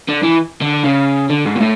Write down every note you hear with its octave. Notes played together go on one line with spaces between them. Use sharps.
D3
E3
D3
C#3
D3
G#2
B2
A2